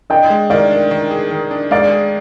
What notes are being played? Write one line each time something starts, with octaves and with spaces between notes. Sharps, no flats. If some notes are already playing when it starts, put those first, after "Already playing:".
D4 D#5 G5
G#3
D#3 D5 F5
D4
D#3
G#4
D#3
D4
G#3 D5 F5
G#4